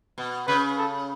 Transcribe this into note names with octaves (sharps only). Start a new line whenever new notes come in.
B2
C#3 B4
A4